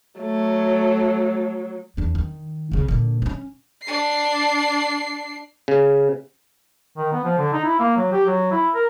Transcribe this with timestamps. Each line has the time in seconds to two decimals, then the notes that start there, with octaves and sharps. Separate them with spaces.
0.20 F#3 A3
1.97 E2 D4
2.15 D#3
2.72 C2 C#3
2.88 A#2 D3
3.22 C4 C#4
3.83 D4 C7
5.68 C#3
6.97 D#3
7.13 B3
7.24 F3
7.38 D3
7.53 D#4
7.65 E4
7.80 A#3
7.97 F#3
8.12 G4
8.26 F#3
8.52 E4
8.74 A#4